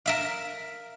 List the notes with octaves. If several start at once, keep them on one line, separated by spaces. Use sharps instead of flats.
A#4 E5 F5